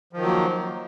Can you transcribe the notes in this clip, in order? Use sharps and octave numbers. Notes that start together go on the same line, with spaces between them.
D#3 F3 F#3 A#3